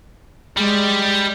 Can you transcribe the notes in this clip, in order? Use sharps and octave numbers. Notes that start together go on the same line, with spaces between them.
G3 G#3